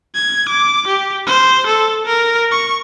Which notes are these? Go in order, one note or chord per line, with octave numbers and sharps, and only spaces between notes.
G#6
D6
G4
C5
A4
A#4
C#6